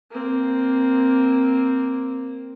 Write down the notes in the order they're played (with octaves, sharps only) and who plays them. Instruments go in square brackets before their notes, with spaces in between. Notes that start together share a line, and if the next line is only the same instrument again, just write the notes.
[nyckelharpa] A#3 C4